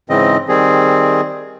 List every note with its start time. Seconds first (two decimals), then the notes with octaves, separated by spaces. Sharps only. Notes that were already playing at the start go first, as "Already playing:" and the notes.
0.10 G#2 C#3 E3 C4 D#5
0.49 D#3 G3 C4 G#4